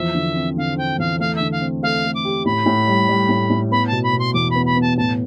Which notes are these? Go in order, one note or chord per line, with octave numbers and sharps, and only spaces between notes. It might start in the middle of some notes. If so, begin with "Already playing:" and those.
Already playing: E2 F3 E5
D3
C4
D3 F5
C4 G5
E2 F5
A3 F5
E5
D3
F5
C4
A3 F5
A3
D6
G4
A2 B5
A2
G3
G3
A2
A2
B3 B5
A5
B2
B5
B2
C6
E2 D6
B5
B3
B5
B3
A5
A2 A5